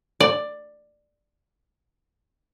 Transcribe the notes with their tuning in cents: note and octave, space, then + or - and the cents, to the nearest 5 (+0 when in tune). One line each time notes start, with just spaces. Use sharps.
D5 +10